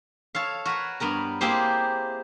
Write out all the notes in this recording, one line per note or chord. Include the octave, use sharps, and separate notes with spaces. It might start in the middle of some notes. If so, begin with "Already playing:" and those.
A4 C#5 F5
F#4 A#4 B4 C#5
G2 B3 A#4 A#5
A#3 C4 E4 G4 G#4 C5